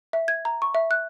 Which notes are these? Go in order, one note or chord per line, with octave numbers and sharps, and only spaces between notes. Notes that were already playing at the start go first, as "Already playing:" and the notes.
E5
G#6
A#5
C#6
E5
F#6